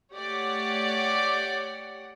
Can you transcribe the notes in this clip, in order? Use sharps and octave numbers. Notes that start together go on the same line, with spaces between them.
A3 G4 C#5 D5 F#5